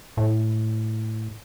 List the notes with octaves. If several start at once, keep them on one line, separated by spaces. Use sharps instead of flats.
A2